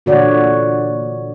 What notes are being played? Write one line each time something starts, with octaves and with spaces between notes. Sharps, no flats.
A#2 D3 E3 F#4 C#5 D5